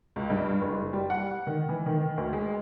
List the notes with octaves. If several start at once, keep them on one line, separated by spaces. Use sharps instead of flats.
C#2
G2
F#1
G3
F#5
D#3
E3
D#3
D2
G#3